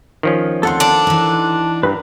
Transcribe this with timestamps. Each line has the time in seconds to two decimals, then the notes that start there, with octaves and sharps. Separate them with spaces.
0.23 D#3 F3 C#4
0.63 D2 C4 A4 F#5 C6
0.80 D4
1.07 E3 D#4
1.83 G2 A#4 B4